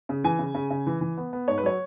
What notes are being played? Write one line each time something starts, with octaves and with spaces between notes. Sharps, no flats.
C#3
E3 G#5
C#3
C#3
C#3
E3
E3
B3
B3
G#2 C#5
B4
F#3 C#5